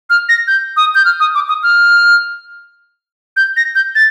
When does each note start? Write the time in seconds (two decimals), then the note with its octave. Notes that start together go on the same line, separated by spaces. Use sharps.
0.10 F6
0.29 A#6
0.47 G6
0.77 D#6
0.95 G6
1.05 F6
1.20 D#6
1.35 D6
1.49 D#6
1.63 F6
3.37 G6
3.57 A#6
3.75 G6
3.95 A6